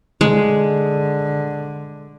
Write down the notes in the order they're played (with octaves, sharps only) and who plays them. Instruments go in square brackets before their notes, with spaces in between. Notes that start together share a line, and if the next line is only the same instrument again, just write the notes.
[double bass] D3 [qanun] G#3